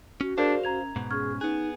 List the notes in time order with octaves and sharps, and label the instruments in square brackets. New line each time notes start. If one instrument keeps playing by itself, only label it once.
[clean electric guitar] C#4 [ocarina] F#4
[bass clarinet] D4 [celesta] G#4 A#4 D5 [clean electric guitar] C5 F5
[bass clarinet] F#2 [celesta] A#5 G#6 F7
[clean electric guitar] G#2 B2
[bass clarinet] C#4 [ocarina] G#4 [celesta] C#6 F6 G#6
[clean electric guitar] B3 G#4 [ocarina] D#4 [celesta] F#6